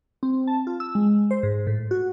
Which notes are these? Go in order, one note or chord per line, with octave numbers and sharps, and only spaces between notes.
C4
A5
F4
E6
G#3
C5
G#2
A2
F#4